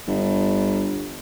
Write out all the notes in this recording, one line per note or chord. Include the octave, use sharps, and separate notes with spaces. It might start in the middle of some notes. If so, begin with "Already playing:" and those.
G1